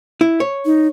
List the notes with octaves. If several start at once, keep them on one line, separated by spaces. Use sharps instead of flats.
E4
C#5
D#4